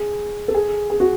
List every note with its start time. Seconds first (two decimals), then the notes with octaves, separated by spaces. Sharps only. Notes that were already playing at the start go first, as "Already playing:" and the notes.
Already playing: G#4
0.48 A4
0.55 G#4
0.90 G#4
1.00 F#4